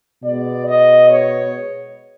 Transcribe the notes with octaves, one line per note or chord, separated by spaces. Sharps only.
B2 G#3 B3 D5
D#5
C#5